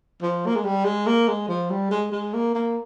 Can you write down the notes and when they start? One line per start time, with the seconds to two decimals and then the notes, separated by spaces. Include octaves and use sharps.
0.22 F3
0.46 A#3
0.55 G#3
0.64 G3
0.85 G#3
1.06 A#3
1.28 G#3
1.48 F3
1.70 G3
1.91 G#3
2.11 G#3
2.33 A#3
2.55 A#3